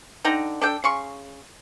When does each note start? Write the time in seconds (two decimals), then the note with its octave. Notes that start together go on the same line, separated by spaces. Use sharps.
0.25 D3 D#4 G5 A#5
0.62 D4 A4 G5
0.84 C#3 C6 C#6